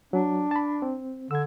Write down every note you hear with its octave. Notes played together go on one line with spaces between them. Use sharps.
F#3 D4
A5 B5
C4
D3 E6 G#6